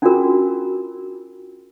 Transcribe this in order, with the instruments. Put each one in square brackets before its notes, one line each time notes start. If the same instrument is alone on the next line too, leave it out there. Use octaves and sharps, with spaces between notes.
[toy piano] C#4 D4 F4 F#4 G#4 A#4